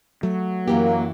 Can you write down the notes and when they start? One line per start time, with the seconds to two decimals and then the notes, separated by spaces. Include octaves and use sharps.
0.23 F#3 A3
0.68 F#2 E3 A#3 G4